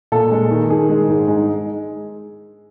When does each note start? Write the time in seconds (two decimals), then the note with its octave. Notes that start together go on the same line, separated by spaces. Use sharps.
0.12 A#2 A4
0.31 G#3
0.51 D#3
0.70 D#3 G#4
0.90 G#3
1.08 G#2
1.28 G#3
1.37 D#4